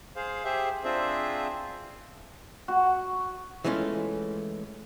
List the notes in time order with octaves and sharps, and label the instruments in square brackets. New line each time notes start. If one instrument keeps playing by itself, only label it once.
[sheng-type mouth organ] G#4 C5 F5
G4 G#4 C5 E5
C4 D4 F4 G#4 C5 E5
[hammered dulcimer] F#4
[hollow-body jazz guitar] E3 G#3 A3 C#4 F4